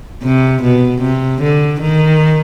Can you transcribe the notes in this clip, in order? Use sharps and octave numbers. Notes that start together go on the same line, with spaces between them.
C3
B2
C3
D3
D#3